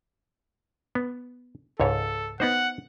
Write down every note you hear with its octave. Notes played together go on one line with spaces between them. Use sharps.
B3
C#2 G#2 A4 C#5
B3 D#4 C5 F#5